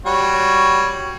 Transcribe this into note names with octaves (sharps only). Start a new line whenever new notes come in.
G3 F#4 C#5